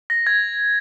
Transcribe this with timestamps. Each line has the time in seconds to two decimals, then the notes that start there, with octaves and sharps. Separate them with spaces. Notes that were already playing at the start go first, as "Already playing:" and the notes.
0.10 A#6
0.27 G#6